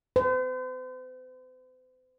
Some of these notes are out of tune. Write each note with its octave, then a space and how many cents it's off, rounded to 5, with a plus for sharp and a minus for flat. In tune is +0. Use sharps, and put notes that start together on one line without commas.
C5 -45